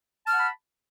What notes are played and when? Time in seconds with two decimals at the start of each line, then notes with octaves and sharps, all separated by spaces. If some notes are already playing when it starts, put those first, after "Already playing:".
0.24 A5
0.28 F6
0.32 F#5
0.36 B5